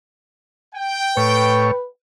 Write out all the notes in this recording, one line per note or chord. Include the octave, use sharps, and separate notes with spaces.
G5
A2 B4 C#5